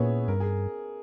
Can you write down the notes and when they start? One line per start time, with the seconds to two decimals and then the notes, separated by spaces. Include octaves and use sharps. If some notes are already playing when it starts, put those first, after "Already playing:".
Already playing: A#2 B3 C#4 E4 G#4 B4 C#5 E5
0.28 G2 A#4
0.40 G#4